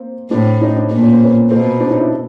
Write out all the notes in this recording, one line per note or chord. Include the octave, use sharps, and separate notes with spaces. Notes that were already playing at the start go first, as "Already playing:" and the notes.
Already playing: A#3 C4
A2 C4 D4
C#4 D#4
C4 D4
A#2 D4
C#4
C4
B3 C#4
B2 A#3 C4
C4 D4
C#4 D#4
D4 E4